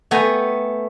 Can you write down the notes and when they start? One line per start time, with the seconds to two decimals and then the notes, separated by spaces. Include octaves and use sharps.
0.11 A3 B3 G5 G#5 A#5